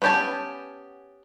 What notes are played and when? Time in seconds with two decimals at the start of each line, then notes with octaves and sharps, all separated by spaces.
0.02 B3 C#4 G4 G#5 A5